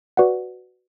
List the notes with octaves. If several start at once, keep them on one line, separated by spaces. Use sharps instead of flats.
F#4 B4 D5 F#5